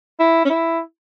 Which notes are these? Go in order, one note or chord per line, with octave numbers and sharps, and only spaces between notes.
E4
C#4
E4